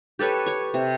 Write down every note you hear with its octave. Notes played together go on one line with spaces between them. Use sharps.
G4 A4 B4 C#5
C#5 C#6
C3